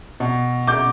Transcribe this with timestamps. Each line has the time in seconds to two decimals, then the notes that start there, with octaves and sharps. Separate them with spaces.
0.20 B2
0.67 B2 D6 G6